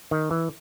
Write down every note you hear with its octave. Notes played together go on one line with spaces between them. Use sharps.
D#3
E3